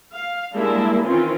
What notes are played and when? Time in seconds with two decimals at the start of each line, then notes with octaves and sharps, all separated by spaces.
0.16 F5
0.54 G3 G#3 A#3 D4 E4
1.04 D#3 E3 C4 C#4 F4